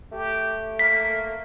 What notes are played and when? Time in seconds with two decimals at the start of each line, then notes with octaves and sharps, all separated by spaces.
0.12 A3 G4
0.79 A#3 B6